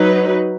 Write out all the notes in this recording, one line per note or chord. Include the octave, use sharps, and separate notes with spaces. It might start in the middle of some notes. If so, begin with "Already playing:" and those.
Already playing: F#3 D#4 B4